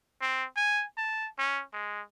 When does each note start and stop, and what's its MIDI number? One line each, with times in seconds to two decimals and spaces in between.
0.21 0.45 60
0.56 0.84 80
0.97 1.28 81
1.38 1.62 61
1.73 2.01 56